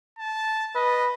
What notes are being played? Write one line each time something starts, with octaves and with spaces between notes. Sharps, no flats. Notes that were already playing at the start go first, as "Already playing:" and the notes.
A5
B4 D#5